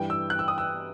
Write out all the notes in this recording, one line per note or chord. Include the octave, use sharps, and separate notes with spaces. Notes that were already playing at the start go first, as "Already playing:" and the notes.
Already playing: G2 E3 G3 G5
E6
F#6
E6
D#6
E6